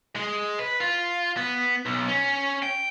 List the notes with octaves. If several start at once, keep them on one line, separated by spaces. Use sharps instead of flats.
G#3
B4
F4
B3
B1
C#4
G5